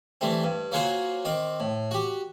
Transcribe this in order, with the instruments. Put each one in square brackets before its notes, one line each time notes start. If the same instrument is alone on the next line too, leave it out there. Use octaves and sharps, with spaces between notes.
[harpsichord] E3 G3 A3 C4
G2
F#3 A#3 F4 F#4 G#4 C5
D#3 C4 D6
A2
F#4 G4